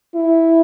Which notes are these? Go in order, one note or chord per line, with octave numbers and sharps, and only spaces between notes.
E4